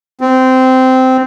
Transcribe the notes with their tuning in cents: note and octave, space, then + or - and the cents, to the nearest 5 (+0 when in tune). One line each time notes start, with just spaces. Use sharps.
C4 -15